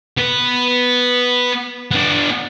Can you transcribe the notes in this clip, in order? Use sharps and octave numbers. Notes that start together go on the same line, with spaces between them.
B3 B4
B3 D4